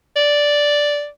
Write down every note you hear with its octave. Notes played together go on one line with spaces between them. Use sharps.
D5